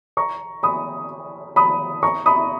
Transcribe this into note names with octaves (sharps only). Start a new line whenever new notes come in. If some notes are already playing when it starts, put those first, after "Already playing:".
A#5 C#6
B5 D#6
B5 D#6
A#5 C#6
B5 D#6